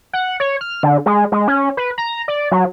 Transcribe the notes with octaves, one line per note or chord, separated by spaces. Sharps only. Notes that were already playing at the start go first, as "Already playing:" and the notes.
F#5
C#5
F6
D3
G#3
G#3
C#4
B4
A#5
D5
F#3